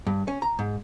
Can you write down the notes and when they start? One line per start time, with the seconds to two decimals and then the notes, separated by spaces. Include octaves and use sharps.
0.07 G2
0.28 C#4
0.42 A#5
0.59 G#2